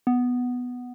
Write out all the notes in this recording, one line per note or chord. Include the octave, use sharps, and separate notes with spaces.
B3